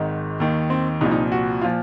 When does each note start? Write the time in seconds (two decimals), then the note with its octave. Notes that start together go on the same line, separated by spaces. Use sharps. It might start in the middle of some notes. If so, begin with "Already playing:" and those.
Already playing: G#1 G#2 D#3
0.40 D#2 D#3
0.70 C4
1.01 C2 A#2 F3 D#4
1.11 D#4
1.32 F#4
1.62 A#2 F3 F4